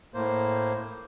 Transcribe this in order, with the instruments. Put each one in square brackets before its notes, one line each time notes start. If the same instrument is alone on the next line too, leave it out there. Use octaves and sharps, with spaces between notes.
[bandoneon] A2 A#3 C5